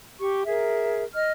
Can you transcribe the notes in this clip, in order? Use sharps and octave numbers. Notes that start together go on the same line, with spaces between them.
G4 C#6
G#4 A#4 E5
D#5 F6